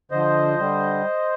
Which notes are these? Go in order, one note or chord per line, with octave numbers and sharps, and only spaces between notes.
D3 F3 C5 D#5
D3 G3